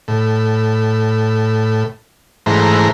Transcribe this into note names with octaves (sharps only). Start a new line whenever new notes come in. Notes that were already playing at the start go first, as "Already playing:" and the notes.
A2
G#2 E3 A3 C5 A#5